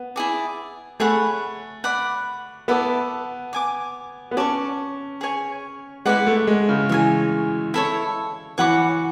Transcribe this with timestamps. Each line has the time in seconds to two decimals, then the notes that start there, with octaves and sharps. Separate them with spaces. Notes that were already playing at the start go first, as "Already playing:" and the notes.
Already playing: B3
0.16 E4 G#4 D5
1.00 A3 G#4 C#5 F#5 B5
1.84 D5 F#5 B5
2.68 B3 E4 A4 D5
3.53 D5 G#5 D6
4.31 B3
4.37 C#4 D5 A5 C#6
5.21 G#4 C#5 G#5
6.05 G#3 E4 B4 D5 F#5
6.27 A3
6.47 G#3
6.69 C#3
6.89 E3 C#5 E5 G#5
7.74 E4 A4 C#5
8.58 E3 C#5 F#5 B5 D6